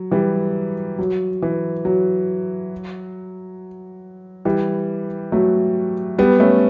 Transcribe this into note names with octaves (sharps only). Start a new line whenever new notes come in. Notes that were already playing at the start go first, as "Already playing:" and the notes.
Already playing: F#3
E3 G3
F#3
E3
F#3
E3 G3
F#3 A3
G3 B3
A3 C#4